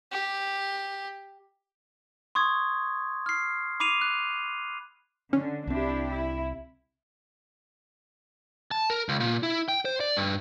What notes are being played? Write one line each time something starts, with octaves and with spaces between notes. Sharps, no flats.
G4
C6 C#6 D#6 G#6
F6 C7
B5 D6 C7 D#7 F7
F#6
D3 C#4
C2 C4 D4 E4 G4
E4
A5
A#4
C#2
A#2
E4
G5
C5
D5
G2